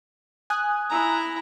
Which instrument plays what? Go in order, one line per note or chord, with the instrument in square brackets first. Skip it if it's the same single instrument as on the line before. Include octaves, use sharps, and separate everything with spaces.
[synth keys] G#5 D#6 F#6
[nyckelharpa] E4 A#5